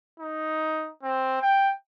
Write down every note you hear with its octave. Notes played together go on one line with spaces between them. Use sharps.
D#4
C4
G5